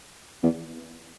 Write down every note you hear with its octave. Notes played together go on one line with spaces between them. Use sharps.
E2